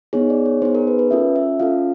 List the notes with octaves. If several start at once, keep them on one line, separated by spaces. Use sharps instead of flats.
B3 D#4 G#4 C#5
D5
C#5
B3 D#4 G#4 C5
A#4
B4
B4
C#4 F4 A4 E5
E5
C#4 F4 A4 F5